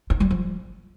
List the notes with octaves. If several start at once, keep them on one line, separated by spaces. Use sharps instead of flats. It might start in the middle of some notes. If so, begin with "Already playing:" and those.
D#4
G3
F3